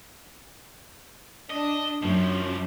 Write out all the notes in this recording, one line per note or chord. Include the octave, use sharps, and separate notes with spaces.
D4 D#5
F#2 F3 C#4